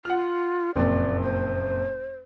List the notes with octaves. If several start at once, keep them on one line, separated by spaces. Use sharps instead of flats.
F4 F#5 F6
F#1 F2 A#2 D5
C5